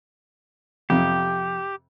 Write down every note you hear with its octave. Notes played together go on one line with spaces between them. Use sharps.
F2 C3 G4